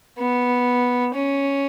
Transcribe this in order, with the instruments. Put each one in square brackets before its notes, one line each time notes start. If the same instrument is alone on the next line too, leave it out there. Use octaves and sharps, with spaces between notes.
[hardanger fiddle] B3
C#4